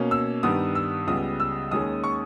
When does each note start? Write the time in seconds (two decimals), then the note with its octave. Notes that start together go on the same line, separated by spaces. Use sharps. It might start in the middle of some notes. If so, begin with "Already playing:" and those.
Already playing: B2 A#3 C#4
0.11 E6
0.43 G2 D#3 G3 B3 D#6
0.75 E6
1.07 C#2 C#3 G3 B3 D#6
1.40 E6
1.71 D#2 D#3 G#3 C#4 D#6
2.04 C#6